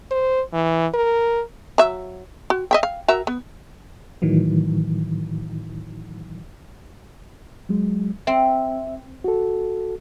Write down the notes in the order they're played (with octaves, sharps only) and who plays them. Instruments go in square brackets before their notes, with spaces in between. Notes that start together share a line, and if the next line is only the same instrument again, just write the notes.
[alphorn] C5
E3
A#4
[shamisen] F#3 E5
F#4
D#5 E5 G5
F5
F#4 A#4 E5
B3
[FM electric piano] A2 D#3 E3 F#3
[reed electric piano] F#3 G#3
[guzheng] C4 [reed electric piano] E5
[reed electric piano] F#4 A4